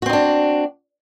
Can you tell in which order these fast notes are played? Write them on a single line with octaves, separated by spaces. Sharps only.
F#4 C4 D#4 D4